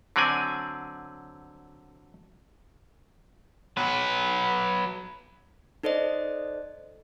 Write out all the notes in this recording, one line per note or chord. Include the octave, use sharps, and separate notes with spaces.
D3 F#3 C4 D5 G#5
F#3 B4
D#4 A4 C5 D5 D#5